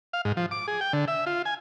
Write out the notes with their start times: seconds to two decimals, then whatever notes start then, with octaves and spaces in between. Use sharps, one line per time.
0.13 F5
0.25 G#2
0.37 F3
0.51 D6
0.68 G#4
0.81 G5
0.93 D3
1.08 E5
1.26 F4
1.45 G#5